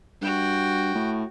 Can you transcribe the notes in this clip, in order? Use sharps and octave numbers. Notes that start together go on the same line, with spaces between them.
G2 F#4 G5
A2